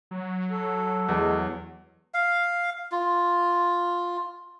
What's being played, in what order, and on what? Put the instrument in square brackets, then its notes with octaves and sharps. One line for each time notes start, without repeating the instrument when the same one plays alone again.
[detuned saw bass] F#3
[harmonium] A4
[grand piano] E2 [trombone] G#3
[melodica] F5
F4